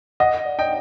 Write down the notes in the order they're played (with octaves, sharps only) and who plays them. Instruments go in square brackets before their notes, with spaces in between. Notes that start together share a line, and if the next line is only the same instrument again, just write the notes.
[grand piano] D#5 [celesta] F#5
[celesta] D5
[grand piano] D#5 G5